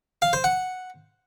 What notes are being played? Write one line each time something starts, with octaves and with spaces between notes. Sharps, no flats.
F5
C5
F#5